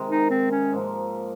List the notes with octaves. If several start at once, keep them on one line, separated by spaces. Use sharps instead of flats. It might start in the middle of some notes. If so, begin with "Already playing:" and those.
Already playing: C3 D#3 G#3
D#4
C4
C#4
G#2 F3 A#3